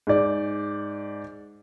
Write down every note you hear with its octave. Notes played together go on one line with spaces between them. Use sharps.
G#2 D5